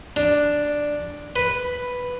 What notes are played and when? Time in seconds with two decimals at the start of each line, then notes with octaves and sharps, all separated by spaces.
0.16 D4
1.36 B4